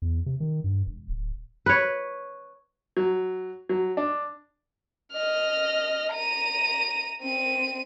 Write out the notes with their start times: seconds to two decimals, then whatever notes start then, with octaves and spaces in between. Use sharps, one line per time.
0.02 E2
0.26 C3
0.40 D#3
0.64 G2
0.86 E1
1.10 D1
1.66 B4 C#5
2.97 F#3
3.69 F#3
3.97 D4
5.13 D#5 F6
6.14 A#5 D#7
7.22 C4 D#7